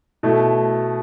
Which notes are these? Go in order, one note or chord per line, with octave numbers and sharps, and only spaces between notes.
B2 A3 E4